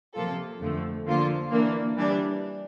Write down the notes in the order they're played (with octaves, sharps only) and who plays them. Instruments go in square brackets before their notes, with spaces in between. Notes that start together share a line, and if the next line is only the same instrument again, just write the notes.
[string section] C3 F3 A#3 F4 A4
F2 D3 F3 A3
D3 F3 A#3 F4
E3 A#3 D4
E3 G3 D4